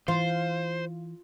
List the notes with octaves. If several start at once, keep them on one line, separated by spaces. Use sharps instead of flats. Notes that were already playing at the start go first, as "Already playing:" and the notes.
E3 F4 C5